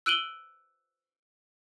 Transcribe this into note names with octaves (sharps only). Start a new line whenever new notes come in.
E6 F#6 D7 D#7 F#7 G7